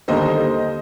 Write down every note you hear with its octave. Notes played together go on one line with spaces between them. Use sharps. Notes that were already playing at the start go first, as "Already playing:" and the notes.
D#2 D3 G3 A#3 C5 D#5